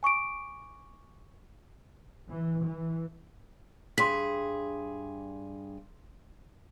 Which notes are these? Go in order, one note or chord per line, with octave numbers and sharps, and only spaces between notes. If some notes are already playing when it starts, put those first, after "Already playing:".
G#5 C#6 D6 D7
E3
E3
G2 G#4 C6 B6